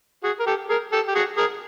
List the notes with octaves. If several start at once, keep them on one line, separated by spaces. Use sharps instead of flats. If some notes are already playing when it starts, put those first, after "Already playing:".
F#4 G#4
A#4
G4 A4
G#4 A#4
G4 A4
G4
F#4 G#4
G#4 A#4